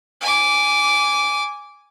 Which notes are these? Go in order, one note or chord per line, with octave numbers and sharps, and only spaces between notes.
G#5 D6